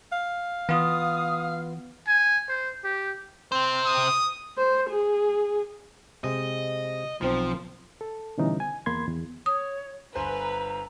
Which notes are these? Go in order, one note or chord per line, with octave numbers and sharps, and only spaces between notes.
F5
E3 B3 F4 D#6
G#5
C5
G4
C3 C4 C5
D#6
C5
G#4
C3 G#3 D#5
B1 F3 C4
A4
B2 D3 E3 G3 C#4 D#4
G#5
E2 A#3 B5 C6 G#6
E2
C#5 D#6
G1 B4 C5 G#5 A#5